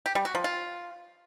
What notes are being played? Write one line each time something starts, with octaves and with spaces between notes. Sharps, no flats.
G4
G3
F#4
F3
F4